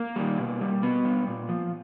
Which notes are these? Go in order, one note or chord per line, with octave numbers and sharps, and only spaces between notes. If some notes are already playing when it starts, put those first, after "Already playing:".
Already playing: A#3
D#3 G3
B2
G3
B2 B3
G3
A#2
F3